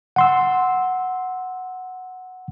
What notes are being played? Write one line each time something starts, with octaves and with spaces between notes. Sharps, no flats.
F#5 C6 E6